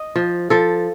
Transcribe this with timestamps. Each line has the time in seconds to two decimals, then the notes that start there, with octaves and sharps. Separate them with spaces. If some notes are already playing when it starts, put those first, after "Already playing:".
Already playing: D#5
0.16 F3
0.50 F3 A4